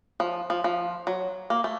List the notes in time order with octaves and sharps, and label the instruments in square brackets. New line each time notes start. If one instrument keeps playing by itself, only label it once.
[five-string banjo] F3
F3
F3
F#3
A#3
A3